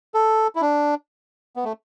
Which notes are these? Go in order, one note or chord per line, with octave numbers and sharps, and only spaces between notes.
A4
E4
D4
B3
A3